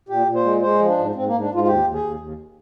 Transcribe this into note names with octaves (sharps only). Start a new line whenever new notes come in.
A#2 G4
A#2
C5
G#3
G#3 C5
F3
D4
G#2
G#2 C4
A#3
G#2
D4
G#2 F4
F4
D#2 G4
D#2
G#4
D#2
D#2